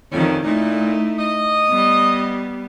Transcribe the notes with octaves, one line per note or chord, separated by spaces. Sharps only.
F2 A2 D#3 G3 C#4
A#2 A3 D#4 E4
D#5
G3 B3